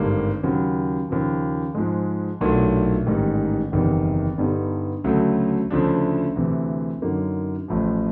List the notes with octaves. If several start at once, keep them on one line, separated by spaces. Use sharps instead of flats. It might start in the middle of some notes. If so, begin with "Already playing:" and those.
Already playing: G#1 G2 D3 G3 A#3
D#2 C#3 F#3
D#2 C#3 F3
G#2 F3 G#3
B1 A#2 F#3 A3 D4
A1 G#2 D#3 G3
F#1 E2 C3 D#3 G3
G2 D3 G3 B3 D#4
D2 C#3 F#3 A3
D2 C#3 F3 A3 D4
D2 C3 E3
F#2 D3 F#3 A#3 D#4
A1 A2 F3